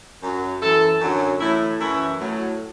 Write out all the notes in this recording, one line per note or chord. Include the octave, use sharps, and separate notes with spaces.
F#2 F#3
F#2 E3 A4
F#2 D3 F#3
A2 E3 E4
F#2 E3 E4
A2 F#3